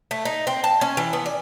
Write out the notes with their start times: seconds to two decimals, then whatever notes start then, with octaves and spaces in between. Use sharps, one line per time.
0.11 A3
0.25 D#4
0.47 C4
0.64 A5
0.81 C#4
0.97 E3
1.13 B3
1.26 D5